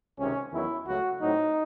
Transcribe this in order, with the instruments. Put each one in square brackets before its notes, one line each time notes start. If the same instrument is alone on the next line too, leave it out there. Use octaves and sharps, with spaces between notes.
[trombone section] C#2 C3 D#3 C#4
E2 D#3 F#3 E4
C#2 C#3 F#3 A3 F#4
A2 F#3 C4 D#4